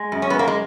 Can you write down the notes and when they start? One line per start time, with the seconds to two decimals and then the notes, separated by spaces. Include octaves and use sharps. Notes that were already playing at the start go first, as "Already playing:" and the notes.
Already playing: G#3
0.12 F#2
0.22 C#4
0.30 F#2 B3
0.39 A#3
0.48 G#3